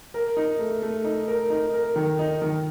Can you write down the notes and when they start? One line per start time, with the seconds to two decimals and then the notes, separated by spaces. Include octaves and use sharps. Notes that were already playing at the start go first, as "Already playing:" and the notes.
0.14 A#4
0.37 D#4
0.59 A3
0.82 A3
1.04 D#4
1.28 A#4
1.50 D#4
1.74 A#4
1.96 D#3
2.19 D#4
2.42 D#3